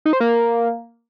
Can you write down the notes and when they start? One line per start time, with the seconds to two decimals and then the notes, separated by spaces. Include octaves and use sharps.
0.05 D#4
0.13 C5
0.20 A#3